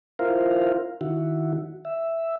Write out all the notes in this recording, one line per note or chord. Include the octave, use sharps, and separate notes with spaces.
E4 F4 A#4 C5 F5
D#3 E4 F#4
E5